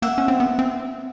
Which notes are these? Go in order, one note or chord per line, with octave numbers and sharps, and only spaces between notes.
A#3 E5 F#5
C#4
C4
B3
C4